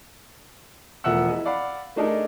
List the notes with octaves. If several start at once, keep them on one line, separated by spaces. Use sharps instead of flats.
E1 F3 A3 E5 F#5 E6
E4 G#4 D#5
D5 F5 F#5 B5
A3 D4 D#4 G#4 A#4